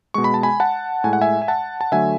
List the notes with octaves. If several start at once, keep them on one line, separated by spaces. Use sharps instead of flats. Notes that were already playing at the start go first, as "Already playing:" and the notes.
B2 G#3 C#6
B5
A5
G#5 B5
F#5 A5
A2 G#3 G#5
F#5
E5 G#5
G#5
F#5 A5
A5
D3 F#3 A3 E5 G#5